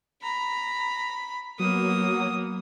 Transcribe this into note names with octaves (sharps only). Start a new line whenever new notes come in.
A#5 B5
F#3 A#3 B3 D#6